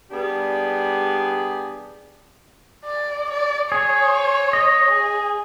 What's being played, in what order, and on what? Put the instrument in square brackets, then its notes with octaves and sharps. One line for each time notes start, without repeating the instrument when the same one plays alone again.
[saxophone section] G3 B3 D4 G4 G#4
[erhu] D5
D5
[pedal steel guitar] G#4 [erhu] C#5
[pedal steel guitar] D#5
[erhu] G#4